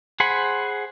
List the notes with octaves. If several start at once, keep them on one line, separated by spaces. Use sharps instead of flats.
G#4 C5 F#5 G#5 B5